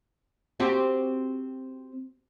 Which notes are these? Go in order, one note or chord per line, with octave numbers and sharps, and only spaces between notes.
C4 F#4 G4